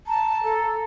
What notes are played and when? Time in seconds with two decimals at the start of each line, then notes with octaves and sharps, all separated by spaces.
0.07 A5 A#5
0.43 A4 A#5